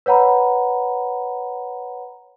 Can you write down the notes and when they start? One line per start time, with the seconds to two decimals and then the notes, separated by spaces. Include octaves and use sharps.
0.06 B4 C#5 F#5 A#5 B5